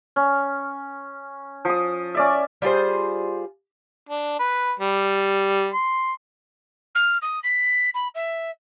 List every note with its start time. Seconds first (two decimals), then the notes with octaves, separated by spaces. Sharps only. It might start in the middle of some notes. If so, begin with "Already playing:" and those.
0.16 C#4
1.65 F3 D#6
2.15 C#4 D5 E5
2.62 G3 F4 G#4 C5
4.09 D4
4.39 B4
4.80 G3
5.74 C6
6.95 F6
7.21 D#6
7.43 B6
7.94 B5
8.14 E5